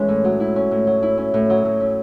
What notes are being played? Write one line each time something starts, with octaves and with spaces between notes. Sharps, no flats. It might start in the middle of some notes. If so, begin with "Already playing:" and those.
Already playing: E3 G#3 C#4
A2
F#3
E4
C#4
A2
F#3
E4
C#4
A2
F#3
A2
C#4